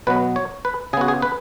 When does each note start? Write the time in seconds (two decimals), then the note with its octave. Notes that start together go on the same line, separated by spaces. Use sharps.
0.07 B2 F#3 B3 B4
0.36 C#5
0.65 B4
0.93 C#3 G#4
0.97 B3 F#4
1.08 G#4
1.22 B4